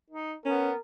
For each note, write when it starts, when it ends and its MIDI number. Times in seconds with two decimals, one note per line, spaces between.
0.10 0.34 63
0.46 0.72 59
0.46 0.70 61
0.46 0.80 70